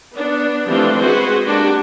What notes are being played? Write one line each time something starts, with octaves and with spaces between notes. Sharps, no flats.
B3 D4
E3 F3 G3 A3 C4 D4
G#3 C4 F#4 G#4 B4 C5
G#3 A#3 D4 F#4 G4